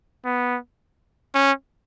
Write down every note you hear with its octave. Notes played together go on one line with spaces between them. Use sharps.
B3
C#4